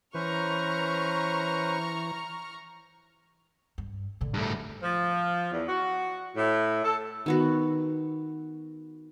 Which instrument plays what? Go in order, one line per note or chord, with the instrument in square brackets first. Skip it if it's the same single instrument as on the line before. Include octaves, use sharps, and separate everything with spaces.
[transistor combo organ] E3 [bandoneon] C#4 B4 C5 [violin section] A#5 C#6 F6
[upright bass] G2
A2 D3
[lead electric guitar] G2 A3
[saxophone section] F3
E2
F#4
A2
A4
[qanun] D#3 B3 F#4